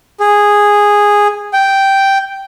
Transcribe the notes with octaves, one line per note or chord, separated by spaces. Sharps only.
G#4
G5